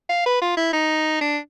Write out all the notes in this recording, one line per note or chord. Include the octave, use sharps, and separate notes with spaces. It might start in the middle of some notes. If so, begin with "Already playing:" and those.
F5
B4
F4
E4
D#4
D4